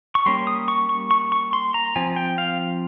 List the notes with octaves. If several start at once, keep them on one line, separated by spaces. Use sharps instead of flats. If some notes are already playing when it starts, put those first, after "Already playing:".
C#6
G3 A#3 C#4 C6
D#6
C#6
C#6
C#6
C#6
C6
A#5
F3 C4 G#5
G5
F5